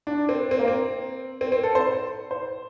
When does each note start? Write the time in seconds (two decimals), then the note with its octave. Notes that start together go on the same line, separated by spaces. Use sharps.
0.07 D4
0.29 C4
0.51 C4
0.59 A#3
0.68 C4
1.41 C4
1.52 C4
1.63 A4
1.75 C5
2.31 C5